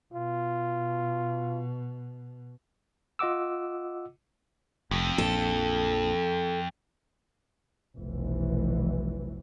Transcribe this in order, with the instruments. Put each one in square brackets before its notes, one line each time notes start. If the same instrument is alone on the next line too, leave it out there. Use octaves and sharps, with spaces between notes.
[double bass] B2 [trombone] F4
[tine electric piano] F4 D#5 F#5 D6 E6
[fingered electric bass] F1 [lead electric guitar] F2
[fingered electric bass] A#1 [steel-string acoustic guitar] A4
[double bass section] F1 B1 E3